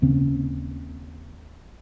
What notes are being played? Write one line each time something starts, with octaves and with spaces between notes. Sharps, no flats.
D#2 C#3 C4 C#4